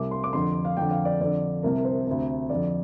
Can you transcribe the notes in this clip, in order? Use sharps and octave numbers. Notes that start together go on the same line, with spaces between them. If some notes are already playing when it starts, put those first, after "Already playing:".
Already playing: C2 C3 D6
C6
D6
F2 D3 C6
F5
F2 D3 G5
F5
D5
F2 D3 D5
C2 C3 A#4
C5
D2 C3
F2 D3 D5